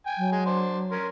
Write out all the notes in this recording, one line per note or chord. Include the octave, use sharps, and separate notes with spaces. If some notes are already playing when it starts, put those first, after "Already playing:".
G5 G#5
F#3
G#3 G#5
D4 C5
C#4 A#4 C6